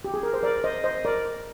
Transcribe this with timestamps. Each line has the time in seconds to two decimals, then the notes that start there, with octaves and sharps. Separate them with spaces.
0.05 G4
0.14 G#4
0.23 A#4
0.33 C5
0.43 A#4 D5
0.64 C5 D#5
0.84 C5 D#5
1.05 A#4 D5